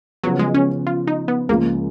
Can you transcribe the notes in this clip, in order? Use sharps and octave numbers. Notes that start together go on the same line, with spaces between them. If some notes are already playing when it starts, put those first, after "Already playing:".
C#3 F3 F#3 B3
G#3
C#4
F4
D#4
B3
C#2 C#3 F3 G#3 A#3